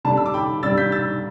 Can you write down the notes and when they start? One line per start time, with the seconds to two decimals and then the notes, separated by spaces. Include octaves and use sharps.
0.05 D3 G3 D4 A5
0.17 E6
0.26 D6
0.34 G5 B5
0.63 G2 G3 D4 E6 A6
0.77 G6 B6
0.92 E6 A6